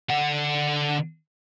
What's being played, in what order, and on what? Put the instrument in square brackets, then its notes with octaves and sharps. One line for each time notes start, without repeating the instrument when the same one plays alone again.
[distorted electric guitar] D3 F#5